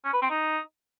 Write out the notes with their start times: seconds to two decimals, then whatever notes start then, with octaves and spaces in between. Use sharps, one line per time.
0.04 C#4
0.13 B4
0.22 C4
0.30 D#4